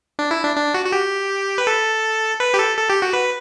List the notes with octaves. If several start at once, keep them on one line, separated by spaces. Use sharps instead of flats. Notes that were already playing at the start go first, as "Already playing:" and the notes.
D4
E4
D4
D4
F#4
F#4
G4
B4
A4
B4
G4
A4
A4
G4
F#4
B4